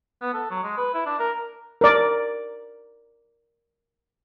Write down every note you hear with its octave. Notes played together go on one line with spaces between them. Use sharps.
B3
A4
F#3
G#3
B4
E4
D4
A#4
A#4 D5